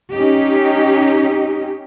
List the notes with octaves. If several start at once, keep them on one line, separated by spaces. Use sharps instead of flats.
C#4 D#4 G4